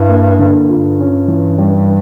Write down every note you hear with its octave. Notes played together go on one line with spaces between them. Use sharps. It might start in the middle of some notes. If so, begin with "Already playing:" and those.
Already playing: G2 E4
A#3
D3
G2 F4
C#4
E3
G3